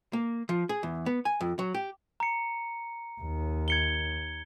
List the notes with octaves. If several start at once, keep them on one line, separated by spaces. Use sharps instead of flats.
A#3
F3
G#4
E2
B3
G#5
F2
F#3
G4
A#5 C#7
D#2 D#3
G#6 C#7 G7